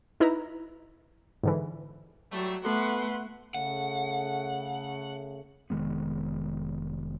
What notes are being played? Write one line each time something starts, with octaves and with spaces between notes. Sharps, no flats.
D#4 E4 B4 A#5
G#2 D3 E3
A2 F#3 G3 A3
A3 B3 A4 B4 F#5 C6
C#3 A3 F#5
F1 D#3 G#3 B3